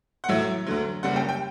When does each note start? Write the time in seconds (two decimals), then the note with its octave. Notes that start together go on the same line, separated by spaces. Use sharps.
0.24 F#5
0.28 A1 A2 F#3 E5
0.67 D2 D3 F#3
1.03 F#1 F#2 C#3 G3 F#5
1.16 G5
1.29 G5